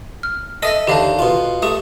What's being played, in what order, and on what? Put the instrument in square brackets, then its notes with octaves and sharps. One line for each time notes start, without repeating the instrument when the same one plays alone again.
[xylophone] F6
[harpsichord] A4 D#6 [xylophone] D#5 E5 A#6
[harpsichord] D#2 D3 [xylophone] G4 F5 A5
[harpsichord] B2 F4
[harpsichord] A3 [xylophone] G4 D#6